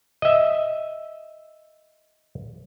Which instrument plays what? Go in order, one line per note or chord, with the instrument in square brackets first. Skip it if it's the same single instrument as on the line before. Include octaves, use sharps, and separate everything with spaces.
[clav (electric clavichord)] D#5 E5